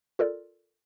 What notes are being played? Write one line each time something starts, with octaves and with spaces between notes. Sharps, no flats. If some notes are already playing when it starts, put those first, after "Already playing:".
F4 A4 A#4 D5